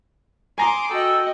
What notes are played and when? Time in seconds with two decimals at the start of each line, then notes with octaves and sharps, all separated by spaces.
0.58 G#5 A#5 C6 D6 D#6
0.90 F#4 A4 D#5 G5 E6